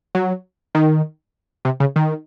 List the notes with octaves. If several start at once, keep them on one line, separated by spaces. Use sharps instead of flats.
F#3
D#3
C3
C#3
D#3